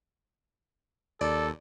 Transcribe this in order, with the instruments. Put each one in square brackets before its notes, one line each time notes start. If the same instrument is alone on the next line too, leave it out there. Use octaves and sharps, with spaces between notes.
[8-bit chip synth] D#2 [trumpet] A4 [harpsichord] D5